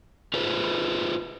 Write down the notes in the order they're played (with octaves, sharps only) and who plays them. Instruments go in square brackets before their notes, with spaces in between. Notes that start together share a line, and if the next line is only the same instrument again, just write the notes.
[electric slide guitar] F4 G#4 B4 C5